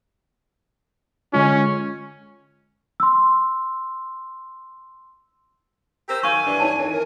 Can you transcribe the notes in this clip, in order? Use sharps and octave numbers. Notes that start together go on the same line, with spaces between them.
D3 G#3 C#4 F4
C6 E6
G4 A#4 C5 E6
D#3 F#3 F5 G#5 C#6
G2 E3 D4
D#4 C#5 A5
F2 D#3 E3 C#5
A#4